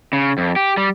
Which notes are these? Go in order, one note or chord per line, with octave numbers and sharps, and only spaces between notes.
C#3
F2
G4
G3